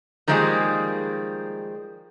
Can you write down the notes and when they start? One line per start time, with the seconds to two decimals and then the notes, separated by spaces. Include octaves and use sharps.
0.28 D#3 F3 G3 G#3 A#3 G#4